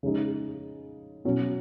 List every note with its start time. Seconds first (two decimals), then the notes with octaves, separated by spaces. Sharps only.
0.03 C#3 G#3 D#4 G#4
1.25 B2 F#3 C#4